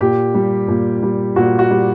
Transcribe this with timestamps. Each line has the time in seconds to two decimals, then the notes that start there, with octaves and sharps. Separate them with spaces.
0.01 A#2 G4
0.34 G3
0.68 A#2
1.03 G3
1.36 A#2 F#4
1.59 F#4
1.71 G3